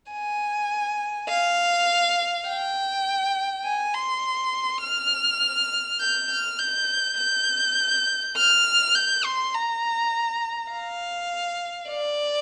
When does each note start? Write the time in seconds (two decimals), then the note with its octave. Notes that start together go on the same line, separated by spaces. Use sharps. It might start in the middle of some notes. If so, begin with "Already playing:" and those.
0.12 G#5
1.29 F5
2.47 G5
3.65 G#5
3.94 C6
4.83 F6
6.00 G6
6.30 F6
6.59 G6
7.18 G6
8.36 F6
8.95 G6
9.24 C6
9.54 A#5
10.71 F5
11.90 D5